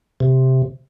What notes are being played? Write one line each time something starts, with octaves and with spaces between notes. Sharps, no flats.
C3